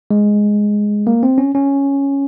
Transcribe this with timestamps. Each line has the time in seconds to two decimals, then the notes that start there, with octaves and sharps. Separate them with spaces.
0.11 G#3
1.07 A#3
1.23 C4
1.38 C#4
1.55 C#4